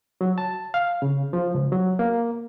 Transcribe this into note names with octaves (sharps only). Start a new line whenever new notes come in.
F#3
A5
F5
C#3
F3
C#2
F#3
A#3